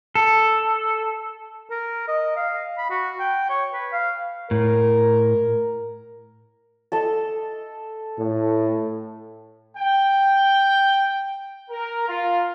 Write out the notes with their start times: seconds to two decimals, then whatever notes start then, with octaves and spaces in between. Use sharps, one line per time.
0.15 A4
1.71 A#4
2.08 D#5
2.37 F5
2.78 B5
2.90 F#4
3.20 G5
3.50 C#5
3.74 B4
3.92 F5
4.51 A2 A#4
6.92 A4 D#5 A5
8.18 A2
9.77 G5
11.70 A#4
12.07 F4